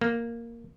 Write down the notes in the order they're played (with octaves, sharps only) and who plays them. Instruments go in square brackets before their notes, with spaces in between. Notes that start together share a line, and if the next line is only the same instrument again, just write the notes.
[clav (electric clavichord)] A#3